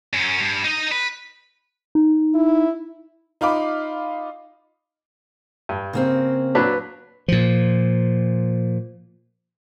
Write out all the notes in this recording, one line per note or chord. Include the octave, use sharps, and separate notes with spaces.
F#2 C#4
G2
D#4 D#5
B4
D#4
E4
D#4 F4 F5 B5 D6
G2
C#3 A#3 C4
A#2 F#3 D4 B4
A#2 F3